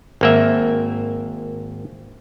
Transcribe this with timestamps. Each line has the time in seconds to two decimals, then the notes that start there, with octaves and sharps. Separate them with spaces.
0.21 G#1 A#3 E5